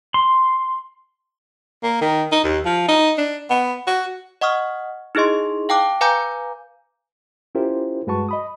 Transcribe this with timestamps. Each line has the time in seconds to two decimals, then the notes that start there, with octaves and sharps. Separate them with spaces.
0.14 C6
1.83 A#3
2.01 D#3
2.32 D#4
2.44 D#2
2.66 F3
2.88 D#4
3.18 D4
3.50 B3
3.87 F#4
4.41 D#5 F#5 C#6 D#6 F6
5.15 D#4 E4 G#4 D#5 C6
5.69 F5 G5 A5 D6 F#6
6.01 B4 F5 G#5 A#5 D6 G6
7.55 C#4 E4 F4 G4 A#4 C5
8.07 G2 G#3 F#4 B4 A5 C#6
8.29 D#5 B5 D#6